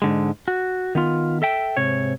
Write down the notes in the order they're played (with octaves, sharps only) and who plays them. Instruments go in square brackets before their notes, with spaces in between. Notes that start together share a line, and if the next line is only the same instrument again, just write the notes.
[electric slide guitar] G#2 D3 G#3
F#4
D#3 B3 F4
A4 E5 G5
G#2 C3 C#5